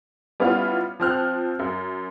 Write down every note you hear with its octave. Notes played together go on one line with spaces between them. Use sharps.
G3 B3 C#4 E4 F4
F3 C4 F6 F#6
F#2